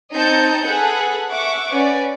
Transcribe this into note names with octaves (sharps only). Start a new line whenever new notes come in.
C4 D#4 D#5 A5 G6 C#7
G#4 A4 B4 F#5
E5 F#5 C#6 D6
C#4 B4 D5